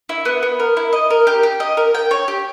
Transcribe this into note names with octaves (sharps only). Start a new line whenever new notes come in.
E4
B3
B3
A#4
E4
D#5
A#4
G4
G4
D#5
A#4
G5
C#5
G4